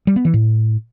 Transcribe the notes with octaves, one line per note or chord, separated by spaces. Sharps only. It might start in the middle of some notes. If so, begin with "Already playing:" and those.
G3
B3
E3
A2